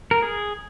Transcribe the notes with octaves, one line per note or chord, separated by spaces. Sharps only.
A#4
G#4